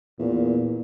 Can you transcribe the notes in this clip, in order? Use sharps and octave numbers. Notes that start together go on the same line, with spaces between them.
E2 A#2